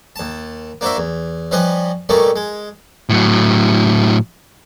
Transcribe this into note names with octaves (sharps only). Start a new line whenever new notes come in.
D#2 A5
A#3 D4 F#4 C5 E5
E2
F3 G3 C#4 B4 D#5
B2 G3 A3 A#3 C#4
G#3
A2 F#3